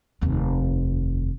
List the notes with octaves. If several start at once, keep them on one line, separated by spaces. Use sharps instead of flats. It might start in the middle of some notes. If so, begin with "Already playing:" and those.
F1 D#2